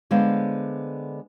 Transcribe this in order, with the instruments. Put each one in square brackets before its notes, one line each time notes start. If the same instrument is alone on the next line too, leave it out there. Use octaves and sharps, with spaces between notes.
[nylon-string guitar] D3 G#3 B3 C5 F5